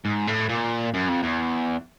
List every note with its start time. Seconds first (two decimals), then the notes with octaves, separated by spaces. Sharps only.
0.05 G#2
0.27 A2
0.49 A#2
0.94 F#2
1.08 F2
1.23 E2